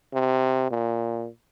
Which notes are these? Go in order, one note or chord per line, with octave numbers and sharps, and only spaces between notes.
C3
A#2